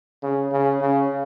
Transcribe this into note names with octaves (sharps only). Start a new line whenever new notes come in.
C#3
C#3
C#3